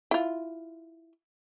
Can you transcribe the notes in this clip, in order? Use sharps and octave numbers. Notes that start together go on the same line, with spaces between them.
E4 F4